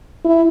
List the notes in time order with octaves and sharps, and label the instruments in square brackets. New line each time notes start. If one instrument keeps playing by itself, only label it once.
[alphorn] E4